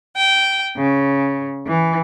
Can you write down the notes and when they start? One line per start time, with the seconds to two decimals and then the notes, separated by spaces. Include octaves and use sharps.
0.17 G5
0.78 C#3
1.68 E3